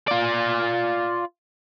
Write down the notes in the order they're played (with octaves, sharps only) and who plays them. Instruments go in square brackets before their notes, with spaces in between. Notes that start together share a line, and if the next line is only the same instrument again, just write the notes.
[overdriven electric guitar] F4 D5